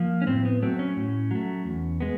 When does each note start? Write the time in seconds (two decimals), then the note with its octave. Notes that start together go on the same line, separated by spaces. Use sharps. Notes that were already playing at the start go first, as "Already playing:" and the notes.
Already playing: F3 A#3
0.22 C#4
0.27 A2 C4
0.45 B3
0.62 F#3 A3 C4
0.79 C#4
0.97 A2
1.31 F#3 A3
1.65 E2
2.00 G#3 B3